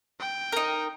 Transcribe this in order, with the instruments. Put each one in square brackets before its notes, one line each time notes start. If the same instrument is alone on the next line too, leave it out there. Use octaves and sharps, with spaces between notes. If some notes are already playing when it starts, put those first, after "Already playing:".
[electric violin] G5
[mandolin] D#4 A#4